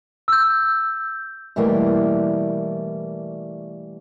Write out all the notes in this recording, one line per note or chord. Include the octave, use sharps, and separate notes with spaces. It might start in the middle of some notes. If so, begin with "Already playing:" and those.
E6 G6
B2 E3 G3 A3 A#3